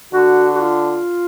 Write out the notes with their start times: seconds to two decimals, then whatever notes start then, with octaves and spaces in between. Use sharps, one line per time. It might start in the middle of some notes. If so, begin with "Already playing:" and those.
0.13 D3 F#4
0.55 F#4
0.61 F4